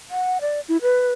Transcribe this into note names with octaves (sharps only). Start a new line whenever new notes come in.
F#5
D5
E4
B4